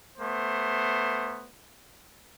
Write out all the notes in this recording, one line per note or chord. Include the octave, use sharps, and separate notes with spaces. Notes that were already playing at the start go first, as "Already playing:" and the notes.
A3 B3 C5